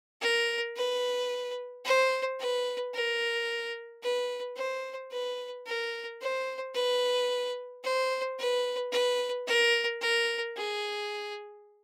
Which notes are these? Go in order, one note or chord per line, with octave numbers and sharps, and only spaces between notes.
A#4
B4
C5
B4
A#4
B4
C5
B4
A#4
C5
B4
C5
B4
B4
A#4
A#4
G#4